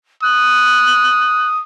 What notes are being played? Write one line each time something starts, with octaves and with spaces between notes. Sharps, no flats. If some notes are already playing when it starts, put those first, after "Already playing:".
D#6 F#6